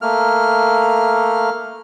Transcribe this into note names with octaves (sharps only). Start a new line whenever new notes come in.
A3 A#3 F6